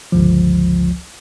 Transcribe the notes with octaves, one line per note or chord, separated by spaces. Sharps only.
G1 C#2 F3